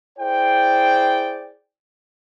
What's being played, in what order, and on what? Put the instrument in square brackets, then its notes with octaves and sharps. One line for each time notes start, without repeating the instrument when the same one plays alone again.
[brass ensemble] E4 G#4 C5 D5 G5